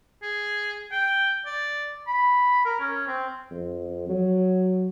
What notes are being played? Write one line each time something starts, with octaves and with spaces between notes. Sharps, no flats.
G#4
G5
D5
B5
A#4
C#4
C4
F2
F#3